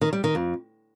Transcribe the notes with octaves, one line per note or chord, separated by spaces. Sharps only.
D#3
G3
D#3
F2